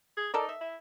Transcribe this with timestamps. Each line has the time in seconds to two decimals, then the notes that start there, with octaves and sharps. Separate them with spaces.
0.17 G#4
0.34 D#4 A4 A#4 D5
0.49 E5
0.61 E4